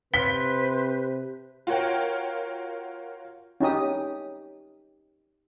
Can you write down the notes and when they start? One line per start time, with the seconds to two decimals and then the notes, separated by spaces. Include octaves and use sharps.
0.14 C3 B4 C5 B6 G7
1.67 F4 F#4 A#4 C#5 F#5 G5
3.60 C#4 D#4 G4 D#6